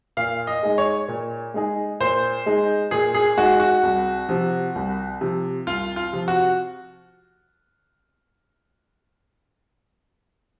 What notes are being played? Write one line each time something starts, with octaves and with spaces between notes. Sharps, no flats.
A#2 F5
D#5
G#3 D#4 G#4
C#5
A#2
G#3 D#4 G#4
A#2 C5
G#3 D#4 G#4
A#2 G#4
G#4
G#3 D#4 F#4 G#4
F#4
C2
C3 F3
C2
C3 F3
C2 F4
F4
C3 F3
F#4